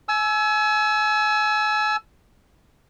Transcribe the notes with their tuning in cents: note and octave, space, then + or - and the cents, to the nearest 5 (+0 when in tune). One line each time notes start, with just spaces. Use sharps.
G#5 +35 E6 +0